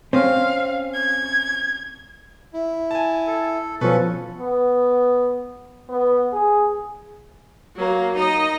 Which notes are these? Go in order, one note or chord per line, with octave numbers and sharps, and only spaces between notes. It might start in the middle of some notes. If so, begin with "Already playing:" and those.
C4 C#4 F5
G#6
E4
G#5 A5
A4
B2 F3 C#4 A4 B4 C#6
B3
B3
G#4
F#3 A#3
D#4 D#5